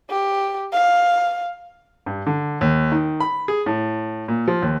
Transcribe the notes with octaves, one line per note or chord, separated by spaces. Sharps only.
G4
F5
G2
D3
D#2
D#3
B5
G#4
A2
A#2
F3
D#2